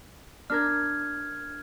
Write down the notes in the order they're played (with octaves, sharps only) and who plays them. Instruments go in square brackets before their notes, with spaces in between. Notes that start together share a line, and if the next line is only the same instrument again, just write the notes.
[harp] D4 A#4 [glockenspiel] F6 G#6